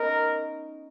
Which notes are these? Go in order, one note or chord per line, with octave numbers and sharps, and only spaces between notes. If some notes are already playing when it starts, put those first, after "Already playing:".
Already playing: B3 C#4 D#4 A#4